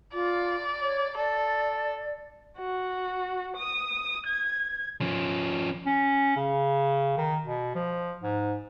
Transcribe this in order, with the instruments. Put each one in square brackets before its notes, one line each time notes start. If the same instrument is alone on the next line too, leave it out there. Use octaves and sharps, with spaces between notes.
[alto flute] F4 [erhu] D5
[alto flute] C#5
[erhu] A4 [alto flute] D5
[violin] F#4
D#6
G#6
[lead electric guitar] F3 C#4
[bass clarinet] C#4
C#3
D#3
B2
F3
G#2